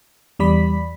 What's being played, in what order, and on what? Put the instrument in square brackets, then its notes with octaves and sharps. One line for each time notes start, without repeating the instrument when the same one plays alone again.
[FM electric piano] E2 G3 D5 B5 B6